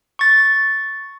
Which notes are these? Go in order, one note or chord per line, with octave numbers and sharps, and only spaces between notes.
C#6 A6